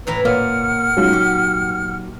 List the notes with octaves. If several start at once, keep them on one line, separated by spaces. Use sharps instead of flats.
A2 E3 B4 E5 A#5
A#2 A#3 A#4 C#5 F#5 F6
F#3 G#3 C#4 D#4 F4
F#4 G4